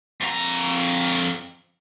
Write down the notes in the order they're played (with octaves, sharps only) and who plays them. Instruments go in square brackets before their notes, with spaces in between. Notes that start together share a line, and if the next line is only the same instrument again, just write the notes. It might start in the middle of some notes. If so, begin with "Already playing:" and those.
[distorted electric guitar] F2 A#5